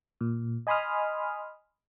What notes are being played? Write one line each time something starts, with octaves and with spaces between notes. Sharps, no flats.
A#2
D#5 G#5 B5 C6 D#6 F6